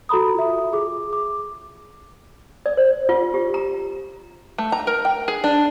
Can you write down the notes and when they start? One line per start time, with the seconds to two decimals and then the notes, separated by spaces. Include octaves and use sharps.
0.09 F#4 A4 A#5 B5 D#6
0.34 F4 A4 E5
0.73 G#4 D6
1.13 D6
2.66 D5
2.77 C5
3.09 F4
3.34 G4
3.54 A#5
4.58 A3
4.72 A#5
4.87 A#4
5.05 G5
5.28 G#4
5.44 D4